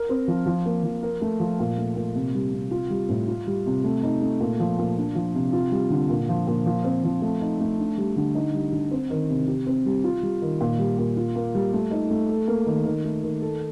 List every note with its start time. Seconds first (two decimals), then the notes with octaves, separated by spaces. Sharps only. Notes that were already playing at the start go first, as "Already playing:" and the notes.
Already playing: A#4
0.09 C4
0.28 F3
0.46 F3
0.66 A#3
0.83 F3
1.03 A#4
1.21 A3
1.40 F3
1.60 A#2
1.77 A3
1.96 A#2
2.15 C3
2.34 G3
2.53 C3
2.71 F4
2.90 G3
3.09 A2
3.28 F4
3.47 G3
3.66 C3
3.84 A3
4.03 D#4
4.22 A3
4.41 A#2
4.60 F3
4.79 A#2
4.98 D4
5.15 F3
5.35 C3
5.53 F4
5.72 G3
5.90 D3
6.10 A#2
6.29 F3
6.47 A#2
6.66 F3
6.84 C4
7.04 F3
7.22 A3
7.41 D#4
7.60 A3
7.79 D4
7.98 G3
8.16 D3
8.35 D#4
8.54 G3
8.72 D3
8.91 C4
9.10 D#3
9.29 C3
9.48 G4
9.67 C4
9.86 G3
10.04 F4
10.23 G3
10.42 D#3
10.61 A#2
10.79 G3
10.98 A#2
11.17 F4
11.35 A#3
11.55 G3
11.73 A3
11.91 D#4
12.10 A3
12.29 A4
12.48 A#3
12.66 D#3
12.85 D#3
13.04 A3
13.24 D#3
13.42 A4